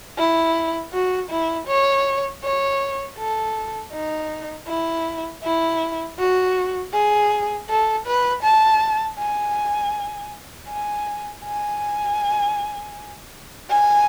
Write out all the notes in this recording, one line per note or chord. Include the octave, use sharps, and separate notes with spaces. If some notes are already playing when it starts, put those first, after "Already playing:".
E4
F#4
E4
C#5
C#5
A4
D#4
E4
E4
F#4
G#4
A4
B4
A5
G#5
G#5
G#5
G#5